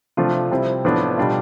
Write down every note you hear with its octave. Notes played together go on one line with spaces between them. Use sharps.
C3 F3 A3 D4 F4
C3 G3 C4 E4
A2 F3 B3 D4
B2 G3 D4 F4